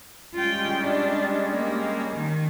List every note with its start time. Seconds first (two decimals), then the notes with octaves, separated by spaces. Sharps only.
0.34 G3 G#3 C#4 F4 G5
0.80 D4
1.51 A#3
2.16 D#3